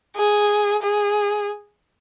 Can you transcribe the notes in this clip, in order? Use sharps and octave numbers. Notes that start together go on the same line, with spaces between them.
G#4
G#4